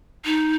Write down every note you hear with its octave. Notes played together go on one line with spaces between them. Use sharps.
D#4